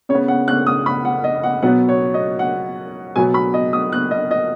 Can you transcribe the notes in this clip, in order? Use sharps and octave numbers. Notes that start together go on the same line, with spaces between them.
C#3 C#5
B3
F#5
F#6
D#6
B5
F#5
D#5
F#5
B2 F#3 B3 F#5
C#5
D#5
F#5
B2 F#3 B3 G#5
B5
D#5
D#6
F#6
D#5
D#5